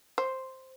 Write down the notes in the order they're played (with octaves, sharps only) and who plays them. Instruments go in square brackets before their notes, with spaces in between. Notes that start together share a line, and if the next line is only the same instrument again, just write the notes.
[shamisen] C5